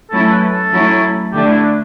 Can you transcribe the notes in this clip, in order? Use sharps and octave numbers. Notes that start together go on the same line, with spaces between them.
F#3 A3 C#4 E4 A4
B4
A4
F#3 A3 C#4 E4
D3 A3 D4 G4
E4
D4